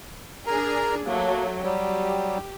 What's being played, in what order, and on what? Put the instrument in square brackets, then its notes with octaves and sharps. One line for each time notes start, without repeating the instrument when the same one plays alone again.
[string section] D4 G#4 [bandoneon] A#4 A#5
[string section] F#3 A3 [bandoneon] A#3
[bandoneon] F#3 G3 [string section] G4